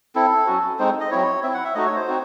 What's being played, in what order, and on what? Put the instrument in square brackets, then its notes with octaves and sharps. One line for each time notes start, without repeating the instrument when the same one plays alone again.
[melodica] C4 E4 A4
F#3 C#4 F#4
G#3 C4 D#4 C5
D#5
F#3 C4 E4 C#5
C4 E4 E5
F#5
E5
A3 D#4 F#4 D#5
C#5
C5
C4 D#4 F#4